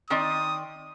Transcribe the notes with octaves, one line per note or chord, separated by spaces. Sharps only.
D#3 C4 D5 D#6